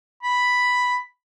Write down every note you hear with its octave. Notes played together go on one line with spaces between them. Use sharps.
B5